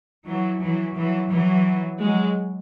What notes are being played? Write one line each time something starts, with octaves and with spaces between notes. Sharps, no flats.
E3 F#3
E3 F#3
E3 F#3
E3 F#3
F#3 G#3